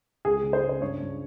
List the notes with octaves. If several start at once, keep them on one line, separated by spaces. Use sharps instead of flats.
C#2 G#4
C#3
C5
C#3
C5
G2 C#5
G2